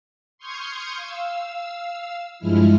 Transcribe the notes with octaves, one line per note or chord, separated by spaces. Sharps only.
C6 C#6 D#6 F6 G6 G#6
F5 E6
G2 F3 G#3 E4 F6